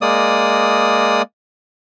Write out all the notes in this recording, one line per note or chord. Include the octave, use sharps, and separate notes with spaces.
G#3 A#3 D5 D#6